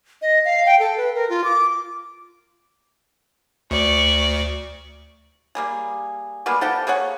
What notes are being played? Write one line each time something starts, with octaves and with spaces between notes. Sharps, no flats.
D#5
F5
G5
A4
B4
A#4
F4
D6
D2 D5 C#6
G3 A#3 G#4
G3 G#3 A#3 B3
F3 A4 F#5 G5
A#3 G#4 C#5 F#5